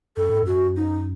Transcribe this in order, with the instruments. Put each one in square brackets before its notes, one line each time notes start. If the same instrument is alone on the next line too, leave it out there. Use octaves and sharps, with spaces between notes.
[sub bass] F#2 [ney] A4
[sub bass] G#2
[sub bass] F#2 [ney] F#4
[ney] D#4